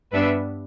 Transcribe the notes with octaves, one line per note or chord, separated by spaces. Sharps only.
G2 G3 B3 D4 B4 E5